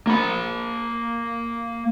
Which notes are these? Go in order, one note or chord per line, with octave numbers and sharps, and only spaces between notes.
A#3 B5